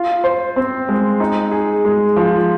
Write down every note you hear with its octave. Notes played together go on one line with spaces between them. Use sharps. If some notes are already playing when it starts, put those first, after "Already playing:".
Already playing: F4
C5
C4
G#3
D#4
G#4
G#3
F3